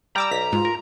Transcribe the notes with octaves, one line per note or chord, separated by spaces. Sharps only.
G3 D5 G5 A#5 D6 E6
B1 B6
G#2 F4
A#4